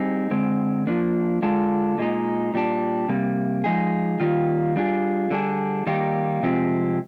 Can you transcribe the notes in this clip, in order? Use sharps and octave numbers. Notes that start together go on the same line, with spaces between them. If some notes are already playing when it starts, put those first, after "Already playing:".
Already playing: G3 C4 D#4 G#4
D3 G#3 C4
F3 A#3 D4
D3 G#3 D4 F4
A#2 G#3 D#4
A#2 G3 D4
C3 G3 A#3
F3 G#3 D#4 G#4
D#3 G3 A#3 F4
G3 D4 F4 G#4
D3 G3 D4 G#4
D#3 G3 A#3 D#4 G4
C3 F3 G#3 C4 G4